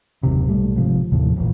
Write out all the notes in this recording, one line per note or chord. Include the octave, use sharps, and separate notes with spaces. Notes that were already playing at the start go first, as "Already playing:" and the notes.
F#1 D#2 C3
B1 G#2 G3 A3
G1 G#2 C3 F3
D#2 A2 C3 F3
D#1 A#1 E2